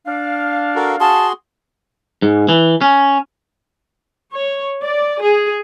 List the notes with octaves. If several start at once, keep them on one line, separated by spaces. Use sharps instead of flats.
D4 F5
F#4 A4 A#4
F#4 G#4 A5 C6
G#2
E3
C#4
C#5
D5
G#4